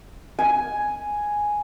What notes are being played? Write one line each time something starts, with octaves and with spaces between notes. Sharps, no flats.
G#5